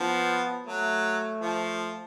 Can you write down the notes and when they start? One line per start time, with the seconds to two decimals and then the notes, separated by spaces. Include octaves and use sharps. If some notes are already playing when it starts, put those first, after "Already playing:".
Already playing: F3 B3
0.67 F#3 A3
1.41 F3